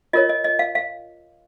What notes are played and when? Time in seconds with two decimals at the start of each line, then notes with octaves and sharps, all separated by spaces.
0.13 F4 A#4 C#5 D#5
0.29 D#5
0.44 D#5
0.59 F5
0.75 F5